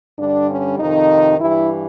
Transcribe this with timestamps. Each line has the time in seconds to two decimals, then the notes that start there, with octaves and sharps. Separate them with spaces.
0.19 G2 D3 G3 D4
0.49 C#4
0.79 F2 C3 D#3 D#4
1.39 G2 E3 G3 E4